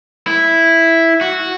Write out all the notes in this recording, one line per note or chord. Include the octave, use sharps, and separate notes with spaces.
E4
F#4